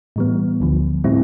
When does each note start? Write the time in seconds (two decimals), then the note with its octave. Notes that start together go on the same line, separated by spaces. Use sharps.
0.16 A2 E3 G3 B3
0.60 D2 D3 F3
1.04 A2 G3 C4 E4